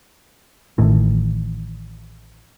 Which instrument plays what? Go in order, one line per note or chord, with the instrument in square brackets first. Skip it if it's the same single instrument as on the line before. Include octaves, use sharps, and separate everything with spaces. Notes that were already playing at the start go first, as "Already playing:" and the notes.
[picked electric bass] A1 A2 D#3 E3